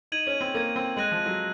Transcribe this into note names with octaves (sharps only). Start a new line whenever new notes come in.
D#4 G#6 D#7 F#7
C#4
C4
A#3 G#6 D#7 F#7
C4
G#3 F#6 A#6 D#7 F#7
F3
F#3